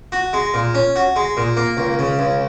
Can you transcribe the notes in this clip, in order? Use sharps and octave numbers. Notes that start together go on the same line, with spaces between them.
F#4
G#3
A#2
C#4
F#4
G#3
A#2
A#3
C#2
C#3
C#2